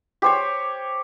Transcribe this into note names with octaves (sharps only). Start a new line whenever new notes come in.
G4 C5 C#5